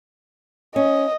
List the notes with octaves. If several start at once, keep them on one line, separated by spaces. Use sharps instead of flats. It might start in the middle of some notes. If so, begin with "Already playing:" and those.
C#4 D#5